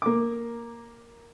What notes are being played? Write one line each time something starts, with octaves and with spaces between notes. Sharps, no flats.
A#3 D6